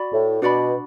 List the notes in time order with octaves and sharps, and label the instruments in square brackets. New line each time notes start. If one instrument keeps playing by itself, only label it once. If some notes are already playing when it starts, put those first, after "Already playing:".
Already playing: [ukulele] F#4 D5 B5
[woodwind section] A2
[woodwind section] B2 [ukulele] D4 F#4 D5 B5